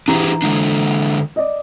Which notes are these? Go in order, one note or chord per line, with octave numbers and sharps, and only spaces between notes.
E3 D4 E4 G4 G#4 A#5
D3 G#3 D4
D5 D#5